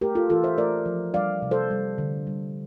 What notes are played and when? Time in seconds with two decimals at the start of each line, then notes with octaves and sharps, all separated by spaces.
0.01 A3 G4 A#4
0.15 F4 A4
0.29 E3 F4 A4
0.44 C5 E5
0.57 A3 A#4 D5
0.86 F3
1.14 G3 D5 F5
1.42 C3
1.51 A4 C5
1.70 G3
1.98 D3
2.27 G3